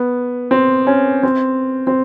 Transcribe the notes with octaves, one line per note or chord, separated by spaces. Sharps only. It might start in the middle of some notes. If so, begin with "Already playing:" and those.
Already playing: B3
C4
C#4
C4
C4